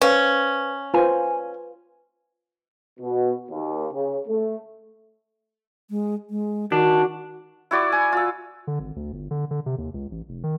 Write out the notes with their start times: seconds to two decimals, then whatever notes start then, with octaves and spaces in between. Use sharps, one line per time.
0.01 C#4 B4 C5 F5
0.94 F4 B4 C5 G#5
2.99 B2
3.49 D#2
3.92 C#3
4.27 A3
5.90 G#3
6.30 G#3
6.72 D#3 D4 D#4 F#4
7.71 E4 F#4 D5
7.92 G#5
8.12 F4 E6
8.67 D3
8.80 G#1
8.96 D2
9.13 G1
9.31 D3
9.51 D3
9.66 C3
9.78 D#2
9.94 C#2
10.11 A1
10.29 F1
10.44 D#3